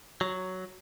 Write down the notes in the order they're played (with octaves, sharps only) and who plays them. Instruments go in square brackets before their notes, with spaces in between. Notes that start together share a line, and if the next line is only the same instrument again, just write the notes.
[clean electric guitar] F#3